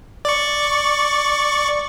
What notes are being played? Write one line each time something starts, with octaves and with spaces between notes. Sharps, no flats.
D5 C#6